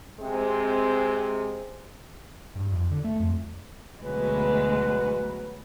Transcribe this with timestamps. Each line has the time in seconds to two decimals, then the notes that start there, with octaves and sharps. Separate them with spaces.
0.20 C3 G#3 C4 C5
2.55 G2
2.72 F2
2.91 D3
3.04 A3
3.20 F2
4.04 D2 B2 F#3 G#3 B4